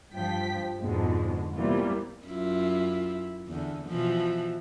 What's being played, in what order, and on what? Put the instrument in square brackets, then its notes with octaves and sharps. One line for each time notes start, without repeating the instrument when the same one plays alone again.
[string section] G2 F3 G5 B6
F2 G#2 B2 D3 G#3
C3 E3 G3 A#3 B3 F4
[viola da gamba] F#2 E4 F4
E2 D3
B2 E3 F3